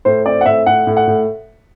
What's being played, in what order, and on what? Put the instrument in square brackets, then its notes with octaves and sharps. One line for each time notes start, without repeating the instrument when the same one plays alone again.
[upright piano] A2 C5
C4 D5
F#5
A2 E5
A2 F#5
A2
F#5
A2